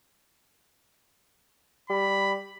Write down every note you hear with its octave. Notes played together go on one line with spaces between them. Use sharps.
G3 B5